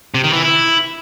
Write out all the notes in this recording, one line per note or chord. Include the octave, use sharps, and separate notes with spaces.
C3
D#3
E3
E4